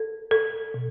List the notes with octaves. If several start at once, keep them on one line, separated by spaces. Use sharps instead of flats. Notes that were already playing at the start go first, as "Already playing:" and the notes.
Already playing: A4
A4
B2